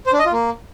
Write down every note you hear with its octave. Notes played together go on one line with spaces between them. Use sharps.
C5
D4
D#5
F4
A#3